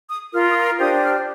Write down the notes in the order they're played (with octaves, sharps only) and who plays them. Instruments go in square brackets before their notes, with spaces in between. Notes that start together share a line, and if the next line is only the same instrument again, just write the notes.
[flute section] D#6
F4 A#4 F6
D#6
F6
D4 G4 C5 D#6
F6